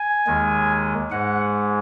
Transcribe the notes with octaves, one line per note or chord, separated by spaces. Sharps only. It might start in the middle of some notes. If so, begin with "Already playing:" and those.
Already playing: G#5
D#2 D#3 G#3
G#2 G#3 F#5